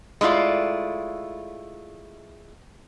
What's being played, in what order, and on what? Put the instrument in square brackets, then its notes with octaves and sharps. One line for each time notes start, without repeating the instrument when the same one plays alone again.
[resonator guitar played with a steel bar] G#3 A3 E4 F4 D5